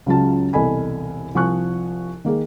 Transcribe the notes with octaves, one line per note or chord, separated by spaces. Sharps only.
C#2 C#3 F#3 F4 A5
E1 C2 A4 D#5 G#5 B5
C2 F3 G#5 C#6 F#6
D#3 A#3 G#4